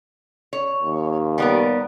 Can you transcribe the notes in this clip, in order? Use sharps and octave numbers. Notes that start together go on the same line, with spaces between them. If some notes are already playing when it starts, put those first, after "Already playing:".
C#5
D#2
G3 B3 A#4